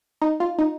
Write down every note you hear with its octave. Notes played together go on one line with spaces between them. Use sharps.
D#4
F4
D#4